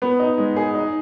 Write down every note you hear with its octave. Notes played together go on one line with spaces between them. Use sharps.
B3
D#4
G#3
G#4
D#4